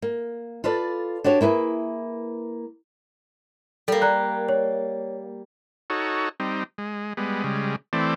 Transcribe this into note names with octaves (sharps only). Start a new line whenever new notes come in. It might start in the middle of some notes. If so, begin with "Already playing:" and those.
A#3
F4 A4 B4 D5
D4 F#4 G4 C#5
A#3 E4 G#4 B4
G3 A#3 A4
D5 A#5 F#6
C#5
D#4 F#4 A4 C#5
G3 C4 D#4
G#3
G3 G#3 B3
C#3 G3 G#3
E3 A3 C4 D5